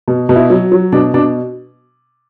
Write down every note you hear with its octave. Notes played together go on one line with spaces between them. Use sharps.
B2
B2
E4
F#3
F#3
B2 D4
B2 D4